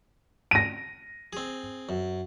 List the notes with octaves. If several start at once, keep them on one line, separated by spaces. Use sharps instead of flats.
A#6 D#7
C4 G#4
F#2